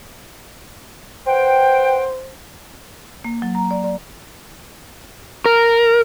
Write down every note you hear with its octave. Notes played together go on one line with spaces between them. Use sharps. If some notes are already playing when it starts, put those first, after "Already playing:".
B4 C5 F#5 G5
A#3
F#3
A#5
D5
D5
A#4